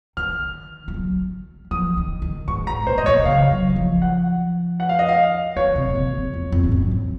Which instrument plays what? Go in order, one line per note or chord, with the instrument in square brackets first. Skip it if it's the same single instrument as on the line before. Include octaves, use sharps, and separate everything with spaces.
[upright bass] D#3 [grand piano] F6
[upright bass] F3
F#3
[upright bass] F3 [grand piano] D#6
[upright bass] D#3
D#3
[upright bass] G#2 [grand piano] C#6
[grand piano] A#5
[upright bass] A#2 [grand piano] C5
[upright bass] G#2 [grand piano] D#5
[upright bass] A#2 [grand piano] C#5
[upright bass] C#3 [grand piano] F5
[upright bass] F#3
F#3
F3
[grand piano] F#5
F#5
F5
D#5
F5
[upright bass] D#3 [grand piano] C#5
[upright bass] C3
A#2
C3
G#2
F2
F2
G#2
F#2
F3